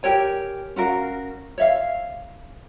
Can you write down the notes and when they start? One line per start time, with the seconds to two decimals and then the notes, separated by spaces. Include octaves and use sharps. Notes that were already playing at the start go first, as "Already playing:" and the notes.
0.03 G4 A#4 C#5 G#5
0.76 C#4 F#4 A#4 F5
1.58 C#5 E5 F5